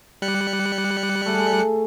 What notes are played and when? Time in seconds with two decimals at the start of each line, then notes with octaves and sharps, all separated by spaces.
0.22 G3 F#6 C#7
1.26 A3 G#4